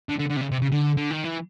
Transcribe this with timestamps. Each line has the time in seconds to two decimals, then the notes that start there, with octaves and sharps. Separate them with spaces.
0.09 D3
0.19 D3
0.30 D3
0.36 C3
0.41 C#3
0.52 C3
0.62 C#3
0.72 D3
0.97 D3
1.10 D#3
1.23 E3